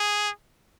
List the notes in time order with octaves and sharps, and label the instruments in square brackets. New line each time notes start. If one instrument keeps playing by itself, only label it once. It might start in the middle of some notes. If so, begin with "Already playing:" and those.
Already playing: [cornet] G#4